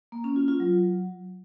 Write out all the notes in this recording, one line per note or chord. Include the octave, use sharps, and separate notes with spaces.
A#3
C#4
F4
F4
F#3